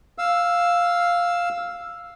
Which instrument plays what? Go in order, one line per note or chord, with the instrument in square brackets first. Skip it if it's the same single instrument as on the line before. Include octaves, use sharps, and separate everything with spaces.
[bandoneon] F5 E6